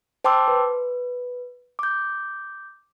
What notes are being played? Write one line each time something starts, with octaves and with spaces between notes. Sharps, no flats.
C5 G5 A5 C6 D6 E6
B4
D6 G6